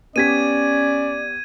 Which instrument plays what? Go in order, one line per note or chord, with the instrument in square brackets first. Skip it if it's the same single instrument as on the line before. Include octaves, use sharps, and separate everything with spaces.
[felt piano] B3 G4 B6 [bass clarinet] C#4 [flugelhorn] D5 [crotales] G#6 D#7